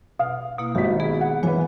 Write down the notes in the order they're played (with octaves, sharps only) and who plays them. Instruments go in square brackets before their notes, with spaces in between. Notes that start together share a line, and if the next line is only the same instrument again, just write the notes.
[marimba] B2 [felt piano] F5
[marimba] B2 A#3 E4
[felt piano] G#1 B2 B6 [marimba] G4
[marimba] G#3 B3 G#4
[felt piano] F#5
[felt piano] E3 B4 [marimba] C#5 F5 G#5